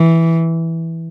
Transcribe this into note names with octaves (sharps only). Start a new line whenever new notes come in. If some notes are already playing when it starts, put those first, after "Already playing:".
Already playing: E3